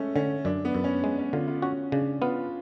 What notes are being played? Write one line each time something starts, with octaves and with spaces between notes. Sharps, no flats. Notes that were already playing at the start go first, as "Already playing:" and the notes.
Already playing: G#3 A3 C#4
D3 C#4
F#2 D4
B3
F#2
C#4
G#3 C#4
C#4
D3 F4
F4
C#4 F#4
C#3 D4
B3 F4